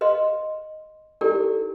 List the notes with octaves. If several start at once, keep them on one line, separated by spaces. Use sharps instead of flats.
B4 D#5 F5 C6
D#4 E4 G4 A4 A#4 D5